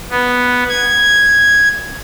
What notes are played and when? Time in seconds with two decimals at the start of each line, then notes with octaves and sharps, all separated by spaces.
0.10 B3
0.69 G#6